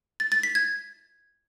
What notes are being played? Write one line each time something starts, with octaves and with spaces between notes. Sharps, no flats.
A6
A6
B6
G#6